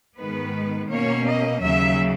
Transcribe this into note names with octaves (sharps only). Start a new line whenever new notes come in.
G#2 D#3 G#3 B3 B4
B2 A#3 C#4 C#5
D#5
D#2 C#3 F#3 E5